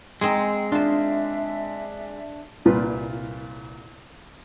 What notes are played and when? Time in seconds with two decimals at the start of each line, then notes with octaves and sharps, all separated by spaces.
0.21 G#3 C4 D#4 G#4 G5
0.72 D4 F4 C5 E5
2.65 C2 A#2 F4 B4